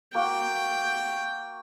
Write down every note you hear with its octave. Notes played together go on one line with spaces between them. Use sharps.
A#3 F#4 G5